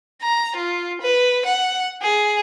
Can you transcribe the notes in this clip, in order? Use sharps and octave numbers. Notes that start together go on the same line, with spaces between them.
A#5
F4
B4
F#5
G#4